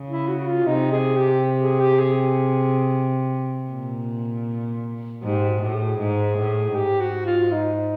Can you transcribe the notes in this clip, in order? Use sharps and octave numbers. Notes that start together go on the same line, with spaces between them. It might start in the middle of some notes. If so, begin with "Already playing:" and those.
Already playing: C#3
E4
F#4
F4
C3 D#4
G#4
G4
G#4
G4
G#4
A#2
G#2 G4
F#4
A2
G#4
G#2
A2
G#2 G4
F#4
F4
D#4